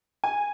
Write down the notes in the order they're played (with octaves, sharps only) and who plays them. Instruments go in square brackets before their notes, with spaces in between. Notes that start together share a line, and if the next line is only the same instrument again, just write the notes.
[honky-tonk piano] G#5